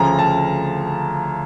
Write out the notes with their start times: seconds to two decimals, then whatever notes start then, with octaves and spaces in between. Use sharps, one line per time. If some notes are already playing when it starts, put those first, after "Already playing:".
Already playing: D2 C#3 F3 A#5
0.19 A5